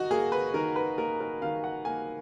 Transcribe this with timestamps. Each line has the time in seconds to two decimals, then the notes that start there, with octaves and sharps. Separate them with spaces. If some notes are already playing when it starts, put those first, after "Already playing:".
Already playing: D#3 D#4 F#4
0.11 A#3 G#4
0.32 B4
0.54 D#3 A#4
0.76 B4
0.98 A#3 A#4
1.20 A#4
1.42 D#3 F5
1.64 F#5
1.85 A#3 G#5